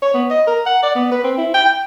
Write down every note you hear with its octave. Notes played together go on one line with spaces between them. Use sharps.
C#5
B3
D#5
A#4
F#5
D5
B3
B4
C4
E4
G5
G5